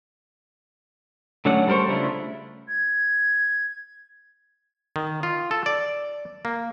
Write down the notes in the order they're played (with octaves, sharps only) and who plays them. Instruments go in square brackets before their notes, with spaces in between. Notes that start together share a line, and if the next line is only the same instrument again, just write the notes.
[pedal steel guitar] D3 F#3 A3 C#4 F#5
G3 A4 A#4 C5 C#6
C#3 A3 D4 E4 F4
[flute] G#6
[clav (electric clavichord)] D#3
F4
A4
D5
A#3